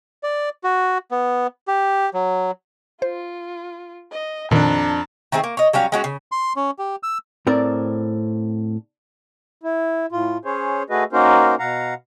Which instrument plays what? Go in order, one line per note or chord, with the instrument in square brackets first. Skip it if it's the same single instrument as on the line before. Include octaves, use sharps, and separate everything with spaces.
[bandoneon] D5
F#4
B3
G4
F#3
[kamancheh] F4 [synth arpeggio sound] C5
[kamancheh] D#5
[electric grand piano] F2 D4 [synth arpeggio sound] A#2 D#3 [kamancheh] A5 A#5
[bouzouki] D#3 A3 C4 G#4
A#3
C#5 D#5
F#3 G3 C#4 F5
G#3 C#4 F#4
C#3
[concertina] C6
C#4
G4
E6
[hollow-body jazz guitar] A2 C4 A#4 D5
[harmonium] E4
A2 F4
C#4 G#4 C5 C#5
A3 F#4 G#4 B4 D#5
A#3 C#4 D#4 F#4 A#4 C5
B2 F5 F#5 A#5